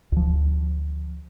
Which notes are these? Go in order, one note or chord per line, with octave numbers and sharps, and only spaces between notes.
D2 F3